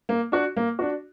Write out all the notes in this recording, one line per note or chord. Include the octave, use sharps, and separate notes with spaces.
A#3
D4 F#4
A#3
D4 F#4